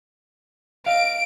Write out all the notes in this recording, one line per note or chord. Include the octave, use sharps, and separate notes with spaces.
D#5 F5 D7